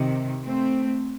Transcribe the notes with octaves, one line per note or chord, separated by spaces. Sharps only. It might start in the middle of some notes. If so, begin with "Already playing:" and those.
Already playing: C3 D#3
A3 C4